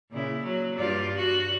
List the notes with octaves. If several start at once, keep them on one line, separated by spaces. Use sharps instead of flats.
A#2 C#3 E4
F#3
G2 F4 D5
F#4